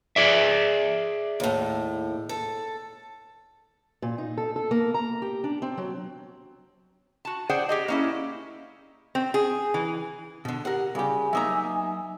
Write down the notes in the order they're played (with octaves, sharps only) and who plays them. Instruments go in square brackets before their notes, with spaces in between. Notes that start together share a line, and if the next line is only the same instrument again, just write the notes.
[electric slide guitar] G#4 D5 E5
[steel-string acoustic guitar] D#2 A2
A4
A#2
D#4
A4
A4
A#3
A#5
G4
D4
C4
F#3
[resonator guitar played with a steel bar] F#4 A5
G#4 C5 D5 F#5 G5
G4 G#4 D#5
A#3 C#4 E4
C4
G#4
E3
[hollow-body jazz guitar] B2 D3
[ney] G4 [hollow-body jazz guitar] A#4 F#5
[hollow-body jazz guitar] C#3 G4 [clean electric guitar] G3 [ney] G#5
[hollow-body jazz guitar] F#3 A#3 A#5 [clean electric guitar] D#4 E5